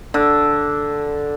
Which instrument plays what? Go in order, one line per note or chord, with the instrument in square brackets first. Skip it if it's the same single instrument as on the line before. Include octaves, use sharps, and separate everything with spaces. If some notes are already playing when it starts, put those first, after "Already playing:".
[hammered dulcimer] D3